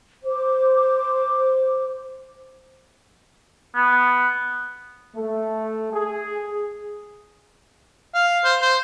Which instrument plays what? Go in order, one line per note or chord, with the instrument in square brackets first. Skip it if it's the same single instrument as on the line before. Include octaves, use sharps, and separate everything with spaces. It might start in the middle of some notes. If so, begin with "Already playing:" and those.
[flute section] C5 D6
[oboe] B3
[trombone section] A3
G#4
[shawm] F5
C5
C5